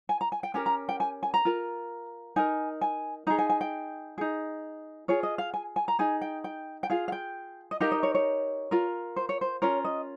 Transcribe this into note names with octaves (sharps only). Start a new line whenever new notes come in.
G#5
A#5
G#5
G5
C#4 G4 A#4 G#5
A#5
G5
G#5
G#5
A#5
F4 A#4
D#4 A#4 G#5
G#5
D#4 G#4 A#5
G#5
G#5
G5
D#4 G#4
F4 G#4 C#5
D#5
F5
G#5
G#5
A#5
D#4 G#4 G#5
G5
G5
G5
F4 G#4 F5
F5
G5
D#5
D#4 G4 A#4 F5
D#5
C#5
C#5
F4 A#4
C5
C#5
C5
C#4 F4 A#4 C#5
D#5